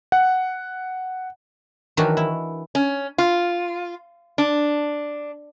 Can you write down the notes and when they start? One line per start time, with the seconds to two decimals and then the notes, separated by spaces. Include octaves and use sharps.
0.12 F#5
1.97 D#3 E3 F#3 D4 F#4
2.17 E4
2.75 C#4
3.18 F4
4.38 D4